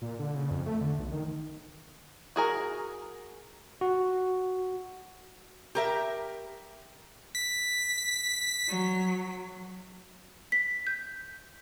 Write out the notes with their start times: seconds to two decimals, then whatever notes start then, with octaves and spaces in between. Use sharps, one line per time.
0.02 A#2
0.19 D3
0.35 C#3
0.51 F2
0.66 A3
0.81 D3
0.99 B1
1.12 D#3
2.36 F#4 G#4 A#4
3.81 F#4
5.75 G4 A#4 E5
7.35 B6
8.68 F#3
10.52 B6
10.87 G6